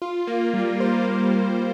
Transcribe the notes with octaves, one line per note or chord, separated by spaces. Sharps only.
F4
A#3
G3
C5
F4
A#3